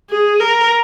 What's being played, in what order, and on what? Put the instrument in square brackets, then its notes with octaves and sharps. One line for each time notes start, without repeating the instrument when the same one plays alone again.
[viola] G#4
A#4